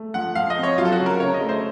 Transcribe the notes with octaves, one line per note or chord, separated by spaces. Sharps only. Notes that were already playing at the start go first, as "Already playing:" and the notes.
Already playing: A3
F3 F#5
F3 F5
D#5
C4
C#5
F#3 F4
A4
F#4
C#3
A#4
C#3 C#5
D#5
A3
C5